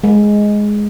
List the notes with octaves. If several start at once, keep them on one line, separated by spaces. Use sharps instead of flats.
G#3